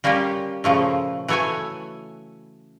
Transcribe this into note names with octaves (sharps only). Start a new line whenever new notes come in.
G3 A#3 C#4 F4 G4
A#2 C#3 F3 A3
E3 F#3 A3 C#5 E5 G#5